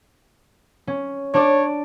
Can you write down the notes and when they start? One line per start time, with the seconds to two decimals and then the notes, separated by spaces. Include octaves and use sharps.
0.87 C#4
1.34 D4 C#5 D5